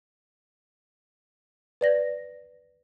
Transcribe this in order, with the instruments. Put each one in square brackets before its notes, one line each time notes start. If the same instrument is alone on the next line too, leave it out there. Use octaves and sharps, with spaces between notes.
[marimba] B4 D5 A#6